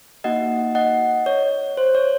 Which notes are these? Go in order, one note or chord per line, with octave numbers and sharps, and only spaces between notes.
A#3 D#4 F#4 D#5 F#5
D#5 F#5
C#5
C5
C#5